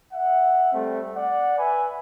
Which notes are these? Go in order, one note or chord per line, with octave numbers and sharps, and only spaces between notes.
E5 F#5
G3 A3 C4
D5 F#5
B4 E5 G#5 B5